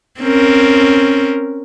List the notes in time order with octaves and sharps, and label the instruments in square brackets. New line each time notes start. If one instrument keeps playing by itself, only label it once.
[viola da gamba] C4 C#4 A#4